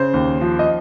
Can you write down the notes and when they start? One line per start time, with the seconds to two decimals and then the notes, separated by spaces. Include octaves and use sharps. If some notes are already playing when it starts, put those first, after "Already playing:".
Already playing: C#3 C5
0.14 D#2
0.41 F3
0.59 D#5